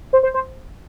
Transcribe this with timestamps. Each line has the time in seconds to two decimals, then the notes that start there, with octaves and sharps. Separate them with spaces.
0.13 C5
0.23 C5
0.34 C5